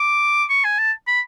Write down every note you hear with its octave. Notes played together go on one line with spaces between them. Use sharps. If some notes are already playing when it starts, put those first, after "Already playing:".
Already playing: D6
C#6
G#5
A5
B5